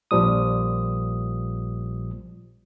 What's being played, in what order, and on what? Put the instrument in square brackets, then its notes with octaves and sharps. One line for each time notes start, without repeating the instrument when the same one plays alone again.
[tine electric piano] A#1 A#2 F3 G3 D#6